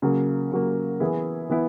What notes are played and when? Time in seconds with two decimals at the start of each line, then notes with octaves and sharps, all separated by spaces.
0.02 C#3 F#3 A#3
0.52 C#3 F#3 A#3
1.00 E3 B3 E4 G#4
1.49 E3 B3 E4